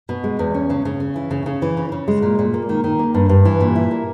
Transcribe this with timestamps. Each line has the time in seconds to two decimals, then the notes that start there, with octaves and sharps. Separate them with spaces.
0.09 B2
0.24 G#3
0.39 E2
0.54 C#4
0.70 C#3
0.85 C#3
1.00 C#4
1.16 E3
1.31 C#3
1.46 C#3
1.62 E3
1.77 C#3
1.92 C#3
2.08 G#3
2.22 A#2
2.39 A#2
2.54 A#3
2.69 D#3
2.84 D#3
2.99 A#3
3.14 G2
3.29 G2
3.45 E3
3.61 A#2
3.76 E4
3.91 A#3